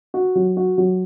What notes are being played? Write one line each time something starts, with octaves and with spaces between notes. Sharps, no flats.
F#4
F#3
F#4
F#3